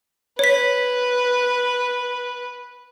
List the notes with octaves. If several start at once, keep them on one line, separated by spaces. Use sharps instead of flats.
B4 C#5 B6